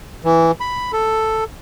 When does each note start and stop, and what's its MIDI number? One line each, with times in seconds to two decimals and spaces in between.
0.24 0.51 52
0.60 0.92 83
0.93 1.44 69